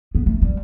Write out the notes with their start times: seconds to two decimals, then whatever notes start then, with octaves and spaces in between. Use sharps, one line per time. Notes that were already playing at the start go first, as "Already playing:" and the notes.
0.15 B3
0.26 A3
0.42 G3